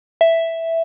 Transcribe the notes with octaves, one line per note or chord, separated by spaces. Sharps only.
E5